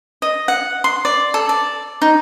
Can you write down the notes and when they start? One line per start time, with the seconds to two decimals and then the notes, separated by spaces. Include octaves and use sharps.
0.22 D#5
0.48 F#5
0.84 C6
1.05 D5
1.34 A4
1.49 D5
2.02 D#4